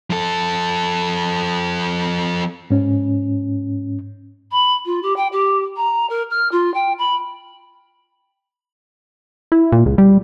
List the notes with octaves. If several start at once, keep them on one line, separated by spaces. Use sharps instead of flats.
F3 A4
G#2 C#4
B5
F4
G4
G5
G4
A#5
A#4
F6
F4
G5
B5
E4
A#2
C#2
G3